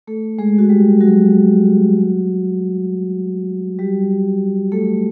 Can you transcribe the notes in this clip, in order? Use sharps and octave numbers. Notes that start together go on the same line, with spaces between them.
A3 A4
G#3 G#4
F#4
G3 G4
F#3 F#4
G3 G4
A3 A4